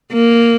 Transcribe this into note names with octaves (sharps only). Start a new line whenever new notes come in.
A#3